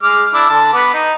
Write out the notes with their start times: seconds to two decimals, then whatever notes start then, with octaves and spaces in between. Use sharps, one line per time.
0.03 G#3 D6 F6
0.33 D4 E4 D6
0.50 D3 A5
0.73 B3 B4 D6
0.93 D#4